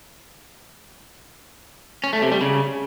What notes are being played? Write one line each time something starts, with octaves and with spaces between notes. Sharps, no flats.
C#4
A3
C3
G3
C#3